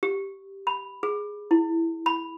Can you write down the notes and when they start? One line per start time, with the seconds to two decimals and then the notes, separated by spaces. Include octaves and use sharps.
0.03 G4
0.67 B5
1.03 G#4
1.51 E4
2.06 B5